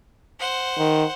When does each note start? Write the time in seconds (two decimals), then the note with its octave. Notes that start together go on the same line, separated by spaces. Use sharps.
0.40 C5 F#5
0.78 D#3